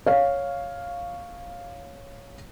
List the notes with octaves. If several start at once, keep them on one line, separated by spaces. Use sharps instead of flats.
C#5 F5